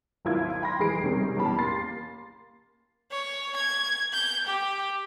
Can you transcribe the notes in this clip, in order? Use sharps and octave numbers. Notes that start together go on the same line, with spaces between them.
G#1 D#2 F#3 E4 F4 G#6
G5 B5 C6 A#6
F1 E3 G#3 C7 D7
C3 D#3 G3 G#3 C#4
A1 E2 C#4 G4 A5 B5
A#3 C6 A6 C7
C#5
G#6
G6
G4